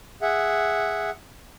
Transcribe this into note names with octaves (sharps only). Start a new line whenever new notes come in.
G#4 E5 F#5